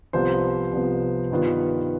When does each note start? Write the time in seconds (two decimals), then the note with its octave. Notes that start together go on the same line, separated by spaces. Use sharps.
0.13 C2 C3 F3 B3 C5
0.72 C2 C3 F3 B3
1.31 G2 D#3 B3 F4